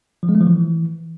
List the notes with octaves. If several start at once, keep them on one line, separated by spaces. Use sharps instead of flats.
F3
G#3
A3
F3
E3